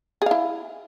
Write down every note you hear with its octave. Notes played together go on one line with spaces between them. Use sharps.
E4 G#4 F5